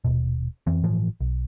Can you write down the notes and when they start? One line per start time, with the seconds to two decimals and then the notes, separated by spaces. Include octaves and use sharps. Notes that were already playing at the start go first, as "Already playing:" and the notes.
0.04 D#1 B2
0.67 F2 E3 C4
0.83 G1 A2 E3 F3
1.20 B1